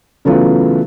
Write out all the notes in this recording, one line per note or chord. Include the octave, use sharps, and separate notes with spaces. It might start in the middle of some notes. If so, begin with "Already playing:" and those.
C#3 E3 F#3 A3 B3 F4